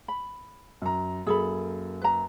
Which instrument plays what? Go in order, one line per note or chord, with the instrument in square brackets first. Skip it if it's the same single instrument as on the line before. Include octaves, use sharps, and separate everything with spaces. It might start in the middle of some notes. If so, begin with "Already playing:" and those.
[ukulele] B5
[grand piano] F#2 A#5
[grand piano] F#2 A#3 [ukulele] G#4 A4 B5
[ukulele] B4 A#5